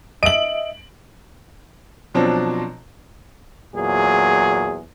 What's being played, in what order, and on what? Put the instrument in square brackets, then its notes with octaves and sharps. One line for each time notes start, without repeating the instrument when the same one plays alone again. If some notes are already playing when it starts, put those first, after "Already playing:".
[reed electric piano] D#5 E5 [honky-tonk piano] D7 F#7
[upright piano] B2 F3 F#3 C4 D4
[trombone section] E2 A#2 F#3 G#4